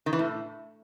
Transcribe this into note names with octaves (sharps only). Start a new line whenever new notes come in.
D#3
E3
A2